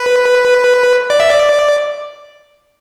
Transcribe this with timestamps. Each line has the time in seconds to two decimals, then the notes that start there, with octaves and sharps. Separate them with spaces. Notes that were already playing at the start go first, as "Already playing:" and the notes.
Already playing: B4
1.10 D5
1.20 E5
1.30 D5